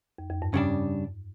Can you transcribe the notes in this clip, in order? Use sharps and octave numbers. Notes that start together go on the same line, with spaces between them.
F2
F2
G2
C#3 G3 D4